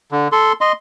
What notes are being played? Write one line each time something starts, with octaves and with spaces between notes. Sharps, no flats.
D3
A4 C6
D#5 C6